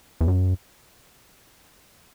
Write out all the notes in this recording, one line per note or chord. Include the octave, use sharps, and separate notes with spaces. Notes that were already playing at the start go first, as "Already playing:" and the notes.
E2
F#2